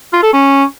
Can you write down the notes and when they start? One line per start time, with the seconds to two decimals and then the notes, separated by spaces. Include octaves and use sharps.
0.13 F4
0.23 A4
0.33 C#4